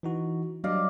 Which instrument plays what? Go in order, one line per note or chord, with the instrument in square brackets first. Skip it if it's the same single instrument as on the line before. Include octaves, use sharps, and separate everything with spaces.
[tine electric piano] E3 D#4 F#4
[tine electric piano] F#3 G3 D4 [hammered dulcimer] D5 D#5 F5